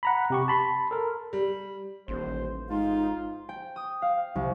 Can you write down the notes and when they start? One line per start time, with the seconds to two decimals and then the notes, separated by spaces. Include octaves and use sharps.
0.03 F#5 A#5 B5
0.30 C3 G4 C#6
0.48 A5 B5 C6
0.91 A4 A#4
1.33 G3
2.08 D#1 A1 C5
2.70 G#2 D#4 F4
3.49 G5
3.76 D#6
4.02 F5
4.35 C2